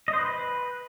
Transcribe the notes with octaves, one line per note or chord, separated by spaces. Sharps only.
D#5
C5
B4